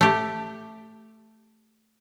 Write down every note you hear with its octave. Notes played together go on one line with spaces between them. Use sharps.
A3 G4